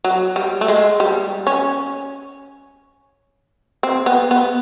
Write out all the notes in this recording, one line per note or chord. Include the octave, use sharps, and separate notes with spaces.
F#3
G3
A3
G#3
G3
C#4
C4
B3
B3